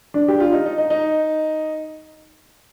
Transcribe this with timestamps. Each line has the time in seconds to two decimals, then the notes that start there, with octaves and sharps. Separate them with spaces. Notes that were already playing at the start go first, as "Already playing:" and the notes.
0.14 D4
0.28 G4
0.40 F4
0.53 D#4
0.66 D#4
0.78 D#4
0.90 D#4